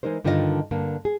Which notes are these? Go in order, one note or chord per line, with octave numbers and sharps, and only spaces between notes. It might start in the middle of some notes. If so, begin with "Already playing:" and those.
E3 G#3 D#4 A#4 C5
G2 D3 D#3 F4 A4 D#5
G2 D3 A#3
G#4